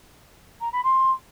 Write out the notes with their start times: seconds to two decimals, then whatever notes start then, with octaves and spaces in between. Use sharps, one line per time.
0.61 A#5
0.72 B5
0.83 C6